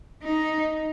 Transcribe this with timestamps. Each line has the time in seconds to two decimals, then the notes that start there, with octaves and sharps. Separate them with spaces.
0.23 D#4